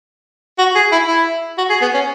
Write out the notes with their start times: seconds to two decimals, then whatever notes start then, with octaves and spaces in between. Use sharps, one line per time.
0.58 F#4
0.75 G#4
0.92 E4
1.07 E4
1.58 F#4
1.70 G#4
1.81 B3
1.94 C#4